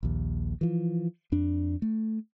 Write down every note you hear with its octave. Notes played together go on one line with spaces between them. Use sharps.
A#1 D#2
E3 F3
F2 D4
A3